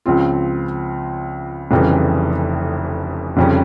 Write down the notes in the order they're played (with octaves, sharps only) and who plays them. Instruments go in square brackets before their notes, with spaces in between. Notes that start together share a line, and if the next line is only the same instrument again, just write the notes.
[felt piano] C#2 C#3 F3 C4 F4
F1 F2 C#3 E3 G3
F1 F2 C#3 G3 C#4